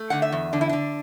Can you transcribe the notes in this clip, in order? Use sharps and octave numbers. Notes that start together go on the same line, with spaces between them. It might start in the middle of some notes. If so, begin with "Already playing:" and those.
Already playing: A3
D3 F#5
E5
E2
D3 D4
E4
D3 D4